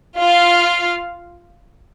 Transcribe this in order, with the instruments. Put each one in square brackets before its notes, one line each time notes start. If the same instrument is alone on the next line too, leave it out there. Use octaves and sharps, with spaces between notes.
[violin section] F4 F5